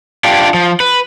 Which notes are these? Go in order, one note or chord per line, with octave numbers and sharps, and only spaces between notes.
D4 F4 G4
F3
B4